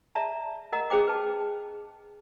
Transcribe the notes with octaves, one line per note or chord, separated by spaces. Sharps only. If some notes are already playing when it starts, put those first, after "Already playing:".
D5 E5 A5 A#5
A#4 D#5 F#5 A#5
C#4 G#4 C5 G5 D6
B4 A5